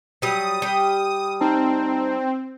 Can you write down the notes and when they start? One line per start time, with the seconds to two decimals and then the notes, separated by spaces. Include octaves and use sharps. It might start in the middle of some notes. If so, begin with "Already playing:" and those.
0.22 F#3 G3 D#6
0.62 G3 G5
1.41 C4 D#4 A5